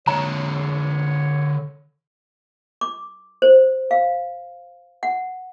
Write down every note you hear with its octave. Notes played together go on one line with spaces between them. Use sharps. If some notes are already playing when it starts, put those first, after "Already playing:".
D3 G#3 C#5 A#5
D6
C5
F5
F#5